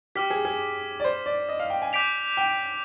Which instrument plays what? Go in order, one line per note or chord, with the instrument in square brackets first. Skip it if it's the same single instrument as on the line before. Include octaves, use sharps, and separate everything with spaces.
[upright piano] G4 [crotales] D6 F6 B6
[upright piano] G#4
G#4
D5
C5
D5
D#5
F5
G5
G#5
[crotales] D6 G6 B6 D7 F7
[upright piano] G5